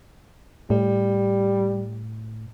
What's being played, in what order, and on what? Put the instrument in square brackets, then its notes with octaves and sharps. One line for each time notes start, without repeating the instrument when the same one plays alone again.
[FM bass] A2 [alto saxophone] G3